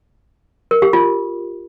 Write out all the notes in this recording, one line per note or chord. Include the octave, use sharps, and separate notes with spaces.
A#4
G4
F4